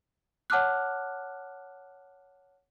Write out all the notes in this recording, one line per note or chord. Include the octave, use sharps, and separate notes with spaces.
C#5 F#5 A5 D6 F6 F#6